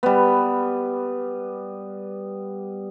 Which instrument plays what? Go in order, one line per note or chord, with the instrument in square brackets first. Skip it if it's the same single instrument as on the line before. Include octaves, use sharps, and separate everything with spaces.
[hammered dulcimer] G3 B3